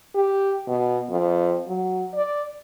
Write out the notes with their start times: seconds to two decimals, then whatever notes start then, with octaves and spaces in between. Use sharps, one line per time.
0.15 G4
0.68 B2
1.10 F2
1.68 F#3
2.15 D5